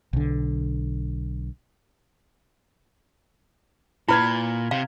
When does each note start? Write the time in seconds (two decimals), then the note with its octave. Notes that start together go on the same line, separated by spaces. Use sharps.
0.13 B1 D3
4.08 A#2 E4 B4 B5 F6 G#6
4.71 C3 F5